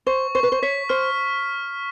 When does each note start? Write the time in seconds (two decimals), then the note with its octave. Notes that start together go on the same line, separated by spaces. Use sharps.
0.07 C5 C#6
0.35 C5 C#6
0.43 B4
0.52 C5
0.62 C#5 B6
0.89 C5 F6